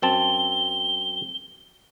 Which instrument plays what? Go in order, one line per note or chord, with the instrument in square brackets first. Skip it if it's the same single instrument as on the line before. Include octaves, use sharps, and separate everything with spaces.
[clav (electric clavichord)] F#2 C4 A5 [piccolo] G7